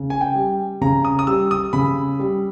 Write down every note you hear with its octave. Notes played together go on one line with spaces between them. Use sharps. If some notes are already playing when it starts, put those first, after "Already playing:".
Already playing: C#3
G#5
G5
G3
C#3 A#5
D#6
D#6
G3 E6
D#6
C#3 B5
G3